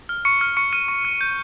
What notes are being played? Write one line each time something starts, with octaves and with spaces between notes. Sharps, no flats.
F6
C#6 C#7
F6
C#6 C#7
F6 D#7
C#6
F6
G6